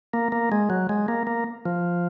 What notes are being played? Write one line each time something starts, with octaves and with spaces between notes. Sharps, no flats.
A#3
A#3
G#3
F#3
G#3
A#3
A#3
F3